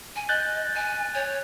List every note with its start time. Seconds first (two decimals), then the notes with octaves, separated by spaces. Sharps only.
0.16 G#5
0.29 D#5 F#6 G6 A6
0.75 G#5
1.14 C#5